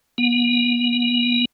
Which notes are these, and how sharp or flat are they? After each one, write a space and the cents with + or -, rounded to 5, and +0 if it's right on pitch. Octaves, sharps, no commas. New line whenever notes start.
B3 -40